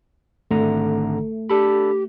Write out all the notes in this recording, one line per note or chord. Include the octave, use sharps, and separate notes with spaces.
G#1 D3 A3 A#5
D4 G4 A4 B5